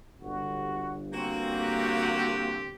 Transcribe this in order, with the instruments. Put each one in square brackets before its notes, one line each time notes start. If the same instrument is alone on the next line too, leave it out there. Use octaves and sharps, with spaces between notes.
[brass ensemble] G1 [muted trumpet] F#4
[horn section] A#3 F#4 [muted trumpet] C4
[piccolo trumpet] G4